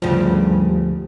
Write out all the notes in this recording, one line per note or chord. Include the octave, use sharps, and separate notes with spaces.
D2 G2 C#3 F3